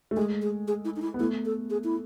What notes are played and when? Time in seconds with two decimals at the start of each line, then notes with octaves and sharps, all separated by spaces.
0.11 A3
0.17 G#3 G#4
0.42 G#4
0.67 G#4
0.85 E4
0.96 D#4
1.02 E4
1.14 B3
1.19 A3 E4
1.45 A4
1.70 G#4
1.84 E4